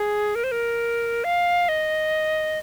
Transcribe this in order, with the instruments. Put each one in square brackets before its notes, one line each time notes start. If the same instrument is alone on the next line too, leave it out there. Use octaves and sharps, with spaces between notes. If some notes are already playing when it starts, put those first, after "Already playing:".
Already playing: [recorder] G#4
A#4
C5
A#4
F5
D#5